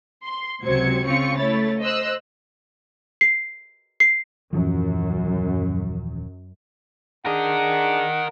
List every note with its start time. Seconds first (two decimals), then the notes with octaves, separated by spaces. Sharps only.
0.25 C6
0.63 C#2 C3 F#3 C5 G#6 C#7
1.06 C#3 C4 F4 C#6 C#7
1.37 A3 E4 C#5 A6
1.81 C5 D#5 E6 F#6
3.21 C7
4.00 C7
4.53 D#1 F#2 E3 F3
7.26 D4 G#4 A#4 D#5 F#5